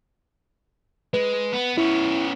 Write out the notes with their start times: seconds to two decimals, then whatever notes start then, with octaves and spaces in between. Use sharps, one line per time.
1.14 G#3 B4
1.53 B3
1.78 B3 C#4 E4